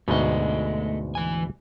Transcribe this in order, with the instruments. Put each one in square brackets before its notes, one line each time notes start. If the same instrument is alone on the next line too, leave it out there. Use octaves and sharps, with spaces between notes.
[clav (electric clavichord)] D2 G#2 B2 [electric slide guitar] A3 D#5
[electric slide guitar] E3 G#5